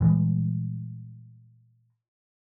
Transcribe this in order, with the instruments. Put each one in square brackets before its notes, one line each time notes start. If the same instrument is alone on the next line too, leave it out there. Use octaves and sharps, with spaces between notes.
[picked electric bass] A#2 E3 G3 G#3